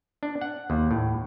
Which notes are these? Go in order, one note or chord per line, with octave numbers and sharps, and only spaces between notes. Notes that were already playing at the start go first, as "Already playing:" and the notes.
D4
F#5
D#2
A2